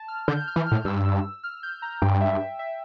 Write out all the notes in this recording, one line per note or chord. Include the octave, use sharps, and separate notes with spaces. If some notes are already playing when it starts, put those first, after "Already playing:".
Already playing: A5
F6
D3 G6
G6
F6
E3
F6
A2
G2 E6
E6
F6
G6
A#5
G2 G5
E5
E5
E5